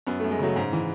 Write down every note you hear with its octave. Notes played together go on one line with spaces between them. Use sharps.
F#2 B3
F#2 A3
G#3
C#3 F#3 A3
G#2
E3